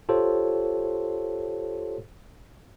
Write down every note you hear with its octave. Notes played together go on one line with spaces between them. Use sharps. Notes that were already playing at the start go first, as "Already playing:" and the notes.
F4 G4 A4 C5 C#5